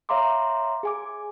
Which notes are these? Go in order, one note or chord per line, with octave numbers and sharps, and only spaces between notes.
C#5 E5 F5 A#5 C6 D6
G#4 G#5 D6